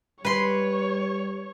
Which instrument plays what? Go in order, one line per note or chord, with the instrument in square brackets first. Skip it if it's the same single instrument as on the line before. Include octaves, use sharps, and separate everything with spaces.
[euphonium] G3 [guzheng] B4 C6 [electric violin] C#5